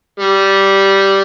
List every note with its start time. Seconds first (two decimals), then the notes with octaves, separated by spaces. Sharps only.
0.20 G3